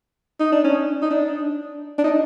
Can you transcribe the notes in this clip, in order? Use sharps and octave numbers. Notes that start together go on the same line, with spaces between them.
D#4
D4
C#4
D#4
D4
D4
D#4